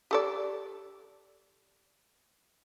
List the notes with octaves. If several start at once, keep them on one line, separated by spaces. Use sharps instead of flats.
G4 A4 D5